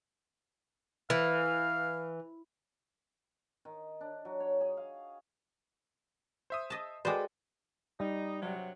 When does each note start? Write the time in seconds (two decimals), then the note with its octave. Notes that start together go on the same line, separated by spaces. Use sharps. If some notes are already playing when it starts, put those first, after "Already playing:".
1.10 E3 F5
3.65 D#3
4.01 D4
4.25 F#3
4.40 C#5
4.61 G#4
4.77 F5
6.50 C5 E5 D#6
6.70 D#5 A5
7.05 G#3 F#4 A4 B4 C5 D5 G5 D6
8.00 G3 D#4
8.42 G2 C3 F#3